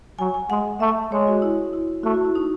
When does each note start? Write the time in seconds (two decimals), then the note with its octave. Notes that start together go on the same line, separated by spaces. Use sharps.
0.19 F#3 G#5
0.34 G#5
0.50 G#3 F#5
0.80 A3 E5
1.11 G#3 C#5
1.27 F#4
1.42 E4
1.73 E4
2.04 A3 F#4
2.14 F#4
2.25 E4
2.35 D#4